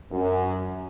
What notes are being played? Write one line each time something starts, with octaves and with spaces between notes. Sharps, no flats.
F#2